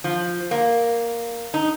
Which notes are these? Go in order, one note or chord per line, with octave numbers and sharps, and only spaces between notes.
F3
A#3
D#4